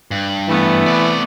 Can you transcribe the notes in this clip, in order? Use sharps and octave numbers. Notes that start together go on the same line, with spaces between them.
G2
E3 A3 B3
C4 D5